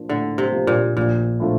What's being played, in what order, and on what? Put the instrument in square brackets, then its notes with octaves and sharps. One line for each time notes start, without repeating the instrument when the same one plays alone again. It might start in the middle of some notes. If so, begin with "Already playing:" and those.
Already playing: [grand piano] F3 A#3 D4
[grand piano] A2 [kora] D3
[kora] C3
[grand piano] F3 A#3 D4
[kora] A#2
[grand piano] A#1 [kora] A#2
[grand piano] A2 F3 A3 D4